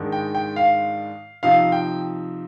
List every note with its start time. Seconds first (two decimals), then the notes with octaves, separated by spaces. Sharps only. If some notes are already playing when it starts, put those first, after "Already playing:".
Already playing: G#2 D#3 G#3 D4
0.12 G5
0.35 G5
0.56 F5
1.43 C3 F3 C4 D#4 F5
1.72 G5